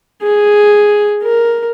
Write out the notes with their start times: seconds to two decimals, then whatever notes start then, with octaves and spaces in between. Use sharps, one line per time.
0.23 G#4
1.23 A#4